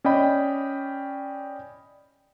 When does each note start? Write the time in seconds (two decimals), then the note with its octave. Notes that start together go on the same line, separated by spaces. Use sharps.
0.04 C#4 D5 D#5 G5 B5